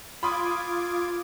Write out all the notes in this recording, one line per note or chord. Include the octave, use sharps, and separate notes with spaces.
F4 B5 C6 D6 D#6 G#6